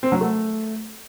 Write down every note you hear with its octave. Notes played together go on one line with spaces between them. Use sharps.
C4
F#3
A3